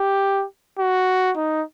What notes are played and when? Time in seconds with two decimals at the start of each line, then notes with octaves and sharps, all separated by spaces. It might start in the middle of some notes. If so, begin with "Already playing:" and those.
Already playing: G4
0.79 F#4
1.37 D#4